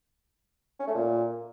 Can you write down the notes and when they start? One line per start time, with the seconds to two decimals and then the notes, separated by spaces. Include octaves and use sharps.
0.80 C#4
0.87 A3
0.94 A#2